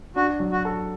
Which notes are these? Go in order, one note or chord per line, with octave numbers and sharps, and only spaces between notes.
D4 F#4
F#3
F#4
A4